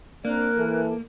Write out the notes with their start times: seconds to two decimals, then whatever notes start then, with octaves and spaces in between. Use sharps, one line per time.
0.25 A#3 C4 D4 A#4 D5 F#6
0.57 E3 A4